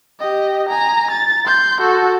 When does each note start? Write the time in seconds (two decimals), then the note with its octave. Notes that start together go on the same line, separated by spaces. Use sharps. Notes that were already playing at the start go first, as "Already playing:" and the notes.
0.20 G4 D#5
0.69 G#5 A#5
1.11 A6
1.45 C6 G6
1.81 F#4 A4